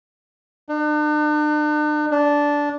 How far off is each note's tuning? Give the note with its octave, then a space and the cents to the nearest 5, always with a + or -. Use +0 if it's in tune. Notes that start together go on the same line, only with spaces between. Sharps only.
D4 +45
D4 -10